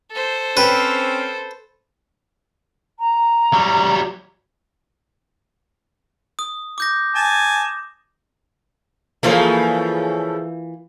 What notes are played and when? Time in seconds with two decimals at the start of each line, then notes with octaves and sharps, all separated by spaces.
0.12 A4 C5
0.57 C4 C#4 B4
2.99 A#5
3.53 F#3 G3
6.39 D#6
6.78 D6 G6 A#6
7.16 G#5 A5
9.23 C#3 E3 F3 A3 A#3 F4